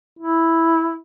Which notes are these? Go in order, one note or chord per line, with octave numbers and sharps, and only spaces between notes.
E4